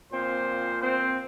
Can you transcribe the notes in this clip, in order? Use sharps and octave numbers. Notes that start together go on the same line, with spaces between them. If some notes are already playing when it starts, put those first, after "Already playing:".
A#2 F3 C4 C5
C4 C5